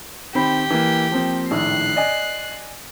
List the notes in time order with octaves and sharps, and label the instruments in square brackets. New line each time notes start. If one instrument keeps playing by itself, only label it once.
[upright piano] D#3 C4 B5 [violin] G4
[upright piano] E3 A#3
F3 A#3 C4
[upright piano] A#1 A2 D#3 [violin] F#6 C7
[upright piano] D5 D#5 G#5